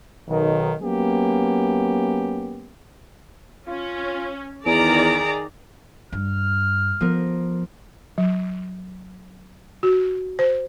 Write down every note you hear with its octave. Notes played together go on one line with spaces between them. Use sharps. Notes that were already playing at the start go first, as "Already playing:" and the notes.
B1 D#3
F#3 A#3 B3 C#4 G4
C#4 F4
E2 D#3 G#4 D5 A#5 D7
G2 F6
F3 B3 A#4
F#3
F#4
C5